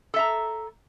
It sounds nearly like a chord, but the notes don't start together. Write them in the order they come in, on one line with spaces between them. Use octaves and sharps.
A4 E5 A#5